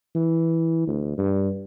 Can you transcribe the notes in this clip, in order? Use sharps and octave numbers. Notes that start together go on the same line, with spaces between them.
E3
D2
G2